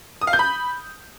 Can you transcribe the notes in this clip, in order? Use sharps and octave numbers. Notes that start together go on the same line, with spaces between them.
D#6
F5
G6
B5